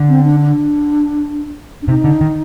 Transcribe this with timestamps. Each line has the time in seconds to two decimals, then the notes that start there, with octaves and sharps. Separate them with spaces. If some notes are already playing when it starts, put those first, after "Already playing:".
Already playing: D3
0.09 C4
0.25 D4
0.40 D4
1.82 D4
1.88 C3 D#4
2.04 D3
2.21 D#3